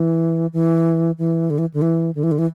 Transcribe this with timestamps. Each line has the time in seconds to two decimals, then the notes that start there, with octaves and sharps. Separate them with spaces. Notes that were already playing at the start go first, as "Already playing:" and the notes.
Already playing: E3
0.53 E3
1.18 E3
1.50 D3
1.58 E3
1.74 D3
1.82 E3
2.15 D3
2.23 E3
2.31 D3
2.38 E3